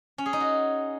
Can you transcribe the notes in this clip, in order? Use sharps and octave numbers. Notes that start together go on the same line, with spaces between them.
C#4
G#4
D#4
F#4